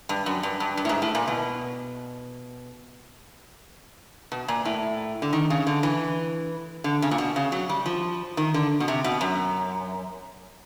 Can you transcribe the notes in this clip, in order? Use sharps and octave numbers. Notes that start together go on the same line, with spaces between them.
G2
F#2
G2
G2
G2
A2
G#2
A2
A#2
B2
B2
A#2
A2
D3
D#3
C#3
D3
E3
D3
C#3
A#2
B2
C#3
F#3
G3
F3
D#3
D3
B2
C3
B2
F#2